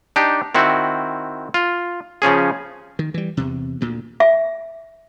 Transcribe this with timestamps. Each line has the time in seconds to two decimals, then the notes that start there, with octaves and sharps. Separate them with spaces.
0.16 D4 D#4 G4
0.55 D#3 C4 E4 F#4
1.54 F4
2.22 C#3 F3 C#4 G#4
2.99 D#3
3.14 E3 G3
3.37 E2 C3
3.81 D2 A#2
4.20 E5